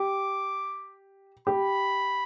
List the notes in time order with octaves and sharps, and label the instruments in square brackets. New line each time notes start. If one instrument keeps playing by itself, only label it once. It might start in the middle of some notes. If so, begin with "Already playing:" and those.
Already playing: [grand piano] G4 [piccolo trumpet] D6
[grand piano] G4 [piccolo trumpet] B5